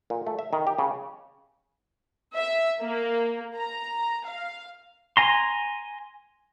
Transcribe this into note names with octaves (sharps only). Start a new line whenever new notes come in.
A#2
A3
E5
D#3
G4
C#3
E5
A#3
A#5
F5
G#5 A#5 C6